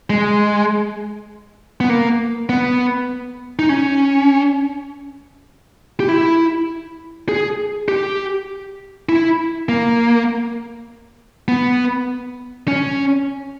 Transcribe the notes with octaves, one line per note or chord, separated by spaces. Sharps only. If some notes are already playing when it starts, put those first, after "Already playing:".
G#3
B3
A#3
B3
D#4
C#4
G4
E4
G#4
G4
E4
A#3
B3
C#4